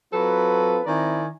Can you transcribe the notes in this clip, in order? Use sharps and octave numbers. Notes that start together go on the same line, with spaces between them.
F#3 C4 F4 A4 B4
D#3 C4 E4 D5 G#5 A#5